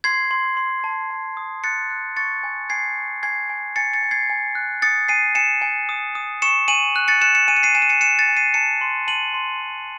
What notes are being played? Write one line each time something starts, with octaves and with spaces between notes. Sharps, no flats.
C6 G#6 C7
C6
C6
A5
A5
D#6
F#6 A6 C#7
F#6
C#6 A6 C#7
G#5
G#5 G#6 C7
C#6
G#5 G#6 C7
G#5
G#5 A6 C#7
A6 C#7
G#5
G#6 C7
G#5
F#6
D#6 A6 C#7
G#5 C7 D#7
G#5 C#7 E7
G#5
D#6
D#6
C#6 C#7 E7
G#5 D#7 F#7
F#6
A6 C#7
F#6 C#7 E7
C#7 E7
G#5 D#7
C#7
C7 D#7
G#5 E7
D#7
C#7 E7
F#6 C#7 E7
A6 C#7
G#5
C7 D#7
A5 C#7 E7
C6
A5 D#7 F#7
C6
C6